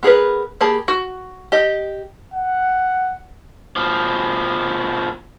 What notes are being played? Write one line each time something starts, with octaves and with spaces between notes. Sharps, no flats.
B3 G#4 A#4 B4
A#3 G4 G#4 A5 B5
F#4
G4 D#5
F#5
B2 F3